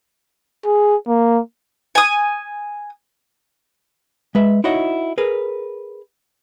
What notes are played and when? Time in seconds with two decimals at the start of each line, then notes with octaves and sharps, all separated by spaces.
0.66 G#4
1.08 A#3
1.95 G#5 D#6
4.35 G#3 B4 E5
4.64 D#4 E4 F#4 C#5 D#5 F#5
5.18 G#4 A#4 B4